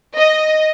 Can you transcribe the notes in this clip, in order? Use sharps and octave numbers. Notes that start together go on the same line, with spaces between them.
D#5